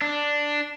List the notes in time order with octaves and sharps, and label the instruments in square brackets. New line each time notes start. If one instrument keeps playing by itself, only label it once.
[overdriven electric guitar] D4